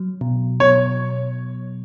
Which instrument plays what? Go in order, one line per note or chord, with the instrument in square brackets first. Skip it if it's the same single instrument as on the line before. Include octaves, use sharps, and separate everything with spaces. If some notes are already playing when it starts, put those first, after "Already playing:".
Already playing: [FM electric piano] F#3
B2
[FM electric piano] B2 [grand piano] C#5